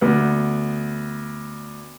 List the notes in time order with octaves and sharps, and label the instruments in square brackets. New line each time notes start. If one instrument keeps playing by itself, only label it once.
[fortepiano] D2 B3